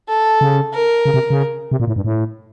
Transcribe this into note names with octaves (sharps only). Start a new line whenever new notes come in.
A4
C#3
A#4
C#3
C3
C#3
C3
A#2
A2
G2
A2